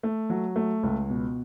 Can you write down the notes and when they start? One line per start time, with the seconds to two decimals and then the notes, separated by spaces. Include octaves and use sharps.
0.03 A3
0.30 F#3
0.56 A3
0.83 C#2
1.09 B2